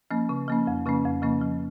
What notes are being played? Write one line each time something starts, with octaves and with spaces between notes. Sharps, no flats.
F3 A#3 C#4
C#3
F3 A#3 C#4
F2
C#3 F3 A#3 C#4
F2
C#3 F3 A#3 C#4
F3